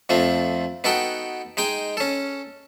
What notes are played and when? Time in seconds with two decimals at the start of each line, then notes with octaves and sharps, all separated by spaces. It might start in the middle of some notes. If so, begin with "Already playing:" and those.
0.09 F2 F3 A3 C4
0.84 B3 D#4 F#4 A4 G5
1.57 G#3 D#4 D#5 G5
1.97 C#4 A4